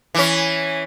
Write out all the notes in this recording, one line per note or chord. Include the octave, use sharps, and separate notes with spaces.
E3 C#4